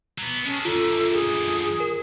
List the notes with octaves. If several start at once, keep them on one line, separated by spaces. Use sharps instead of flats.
F#3 B3
G#3 C#4 A4
F#2 D3 F4 A4
G#4
A#4